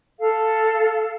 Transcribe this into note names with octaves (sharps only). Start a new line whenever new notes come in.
A4 F5